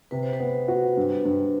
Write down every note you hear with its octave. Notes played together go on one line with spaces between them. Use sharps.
C3 B4
C5
B4
B3
F#4
G2
G2